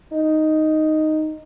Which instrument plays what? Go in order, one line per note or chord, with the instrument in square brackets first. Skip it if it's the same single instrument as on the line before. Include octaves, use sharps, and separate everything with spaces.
[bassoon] D#4